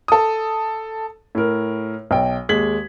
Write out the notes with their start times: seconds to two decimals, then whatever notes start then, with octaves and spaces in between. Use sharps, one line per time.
0.08 A4 D#6
1.35 A2 A#4
2.11 B1 G5
2.49 D#2 G#3 G#6 B6 F#7